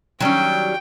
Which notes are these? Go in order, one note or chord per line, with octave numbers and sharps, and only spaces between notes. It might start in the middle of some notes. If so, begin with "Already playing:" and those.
D#3 F#3 G3 C#4 G5